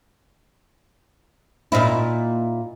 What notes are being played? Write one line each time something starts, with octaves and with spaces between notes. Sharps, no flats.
A#2 D#4 E4